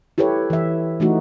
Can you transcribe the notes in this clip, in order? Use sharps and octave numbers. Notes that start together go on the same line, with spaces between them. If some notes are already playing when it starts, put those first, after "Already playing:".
E4 G4 A4 B4 C#5
E3 E5
E3 A3 D#4 F#4